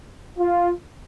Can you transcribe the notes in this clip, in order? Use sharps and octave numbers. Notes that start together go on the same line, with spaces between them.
F4